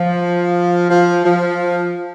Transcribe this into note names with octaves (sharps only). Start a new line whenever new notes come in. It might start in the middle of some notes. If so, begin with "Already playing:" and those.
Already playing: F3
F3
F3